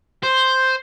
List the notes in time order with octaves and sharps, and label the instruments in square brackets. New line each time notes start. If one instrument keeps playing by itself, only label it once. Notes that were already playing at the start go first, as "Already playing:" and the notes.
[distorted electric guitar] C5